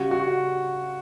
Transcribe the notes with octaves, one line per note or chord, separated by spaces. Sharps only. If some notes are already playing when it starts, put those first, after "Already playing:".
Already playing: C#3 G3 F#4
F#4